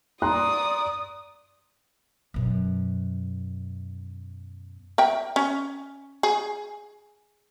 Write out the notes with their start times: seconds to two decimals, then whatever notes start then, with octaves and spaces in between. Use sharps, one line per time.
0.22 D5 A#5 C6 D#6 F#6
2.34 F#2 B2
4.98 A#4 E5 G5
5.36 C#4
6.23 G#4